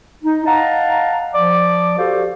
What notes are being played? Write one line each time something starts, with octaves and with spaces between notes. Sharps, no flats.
D#4
D#5 F5 F#5 A5 A#5
F3 D5 D6
F#4 G4 A4 C5 D5 F5